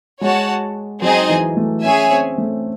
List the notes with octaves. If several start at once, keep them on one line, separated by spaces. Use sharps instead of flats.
G#3 F#4 C#5 F#5 A5
F#3 C4 D#4 G#4 D#5 G#5
E3
A3
C#4 G#4 C#5 E5 G#5
C4
A3